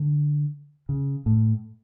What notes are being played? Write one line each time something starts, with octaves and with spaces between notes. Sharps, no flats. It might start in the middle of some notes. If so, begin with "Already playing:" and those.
Already playing: D3
C#3
A2